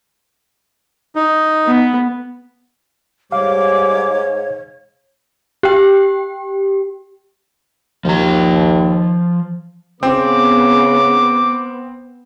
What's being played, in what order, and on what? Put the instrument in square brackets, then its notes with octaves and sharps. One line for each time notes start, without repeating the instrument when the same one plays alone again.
[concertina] D#4
[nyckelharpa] B3
[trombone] G#2 [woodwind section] G3 G4 D6 [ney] C#5 [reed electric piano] F5
[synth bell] G4 G5
[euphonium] D#2 [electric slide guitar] F3 A#5
[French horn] C#3 [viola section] B3 [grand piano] C4 [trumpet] D6